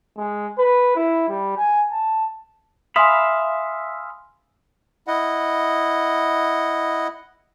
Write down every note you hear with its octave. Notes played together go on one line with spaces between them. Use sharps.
G#3
B4
E4
G3
G#5
A5
E5 F5 G#5 B5 C6 D#6
E4 D#5 F#5